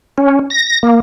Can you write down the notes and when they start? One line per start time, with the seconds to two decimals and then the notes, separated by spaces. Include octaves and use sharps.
0.18 C#4
0.50 A#6
0.83 A#3